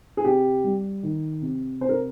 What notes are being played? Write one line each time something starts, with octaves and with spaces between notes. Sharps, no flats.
G#4
C3 G4
G3
D#3
C3
C3 C5
A#4